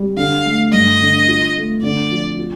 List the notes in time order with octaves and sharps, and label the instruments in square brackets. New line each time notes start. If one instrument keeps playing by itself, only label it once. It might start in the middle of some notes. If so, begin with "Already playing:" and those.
Already playing: [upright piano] G3
[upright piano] D3 [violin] F5
[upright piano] A3
[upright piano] G2 [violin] D#5
[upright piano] D3
F4
A3
[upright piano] D3 [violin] D5
[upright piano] F3
F4